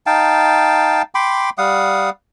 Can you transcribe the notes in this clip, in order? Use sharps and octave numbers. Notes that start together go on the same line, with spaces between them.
D#4 F5 G5 A5
G5 B5 C6 D6
G3 F5 F#5 D#6